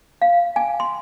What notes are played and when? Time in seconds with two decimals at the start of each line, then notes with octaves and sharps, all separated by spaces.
0.22 F5
0.56 G#5
0.80 C6